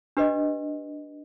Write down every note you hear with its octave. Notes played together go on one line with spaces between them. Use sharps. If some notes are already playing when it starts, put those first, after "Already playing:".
D4 G4 B4 D#5